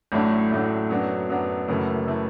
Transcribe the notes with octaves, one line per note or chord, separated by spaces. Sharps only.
A1 A2 F#3 A3 D4
A1 A2 F#3 A3 D4
F#2 F#3 B3 D4
F#2 F#3 B3 D4
F#1 F#2 E3 A3 E4
E3 A3 E4